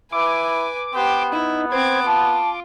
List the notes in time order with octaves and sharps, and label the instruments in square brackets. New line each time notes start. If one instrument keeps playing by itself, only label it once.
[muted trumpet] E4 [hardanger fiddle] B4 G#5 [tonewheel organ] D6
[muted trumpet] B3 [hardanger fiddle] G4 C5
[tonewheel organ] D#4 [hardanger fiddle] E4
[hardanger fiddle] C4 D6 [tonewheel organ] C5 G#6
[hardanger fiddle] F4 [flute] A5 [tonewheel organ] D6